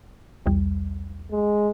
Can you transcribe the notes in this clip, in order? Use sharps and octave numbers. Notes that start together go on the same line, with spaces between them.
B1 E2 G3
G#3